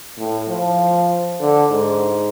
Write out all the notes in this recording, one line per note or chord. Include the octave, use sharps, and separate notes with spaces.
A2
F3
D3
G#2